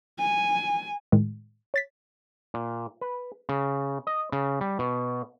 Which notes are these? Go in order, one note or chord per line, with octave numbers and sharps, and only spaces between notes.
G#5
A2 D#3 G#3
C#5 A6 B6
A#2
B4
C#3
D#5
C#3
G3
B2